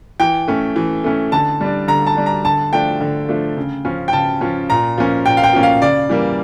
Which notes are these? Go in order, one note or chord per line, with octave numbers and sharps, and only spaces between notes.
E3 G5
A3 C#4
E3
A3 C#4
D3 A5
G3 D4
D3 A#5
A5
G3 D4
A#5
D3 A5
F3 A3 D4 G5
D3
F3 A3 D4
C#3
F3 C#4
G5
C#3 A5
F3 C#4
A#2 A#5
F3 A#3 C#4
A#2 G5
F5
G5
F3 A#3 C#4
F5
C#3 D5
E3 G3 A#3